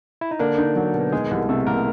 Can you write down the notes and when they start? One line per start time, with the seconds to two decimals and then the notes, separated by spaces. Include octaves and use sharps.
0.21 E4
0.31 D#4
0.39 D3 A#3 D4
0.58 D#4
0.76 F#3
0.95 B2
1.12 D#3 G#3 G#4
1.31 C2
1.49 C3 A3 A4
1.67 C2 A#3 A#4